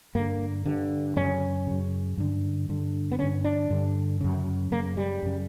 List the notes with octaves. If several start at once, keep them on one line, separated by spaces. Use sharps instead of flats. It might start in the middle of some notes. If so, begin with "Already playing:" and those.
G2 D3 A#3
G2 D3
F#2 C#3 C#4
F#2 C#3
G2 D3
G2 D3
B3
G2 D3 C#4
D4
G2 D3
F#2 C#3
F#2 C#3 A#3
G3
F#2 C#3